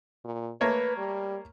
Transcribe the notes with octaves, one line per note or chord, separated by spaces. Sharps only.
A#2
A3 A#3 B4 C#5
G3